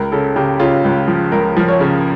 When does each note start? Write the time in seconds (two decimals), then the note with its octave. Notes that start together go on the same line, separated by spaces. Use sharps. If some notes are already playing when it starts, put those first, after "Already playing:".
Already playing: C#2 A#4
0.12 C#3 A4
0.36 C#3 G4
0.60 C#3 F4
0.85 C#2
1.08 F3
1.32 C#2 A#4
1.57 F3
1.68 C#5
1.81 C#3